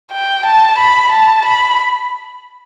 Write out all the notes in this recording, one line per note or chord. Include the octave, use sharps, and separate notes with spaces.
G5
A5
B5
A5
B5